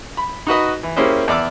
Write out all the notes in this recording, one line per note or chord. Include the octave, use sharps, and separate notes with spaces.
B5
D#4 F#4 B4 D#5
E3
A#3 C#4 E4 G4 G#4 C5
E2 D5 D6 E6